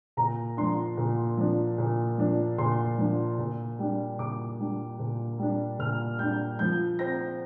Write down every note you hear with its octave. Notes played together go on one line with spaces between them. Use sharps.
A#2 A#5
F3 D4 C6
A#2
F3 D4
A#2
F3 D4
A#2 C6
F3 D4
A#2
G3 D4
A#2 D6
G3 D4
A#2
G3 D4
A#2 F6
G3 D4 G6
F3 G6
C4 A#6